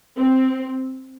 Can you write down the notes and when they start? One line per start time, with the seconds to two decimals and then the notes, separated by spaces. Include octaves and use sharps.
0.17 C4